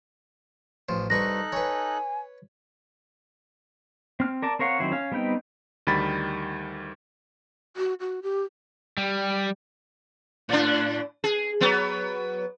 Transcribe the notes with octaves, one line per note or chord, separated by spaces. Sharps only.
A1 F3
C2 D#4 A4 B4 C#6 F#6 A#6
B4 C#5 G#5
C4 F6
A#4 D5 A5
C4 A#4 C#5 F5 F#5
D#3 F#3 C4 E4 C5
C#4 F5
G3 B3 C4 D#4 G5
D2 D#3 G3 B5 A6
F#4
F#4
G4
G3
A2 D4
G#4
F#3 B3